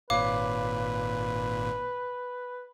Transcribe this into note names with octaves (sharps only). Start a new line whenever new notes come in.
G#1 A#2 B4 C#5 F5 D6